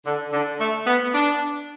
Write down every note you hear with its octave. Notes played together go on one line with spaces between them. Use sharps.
D3
D3
A3
B3
D4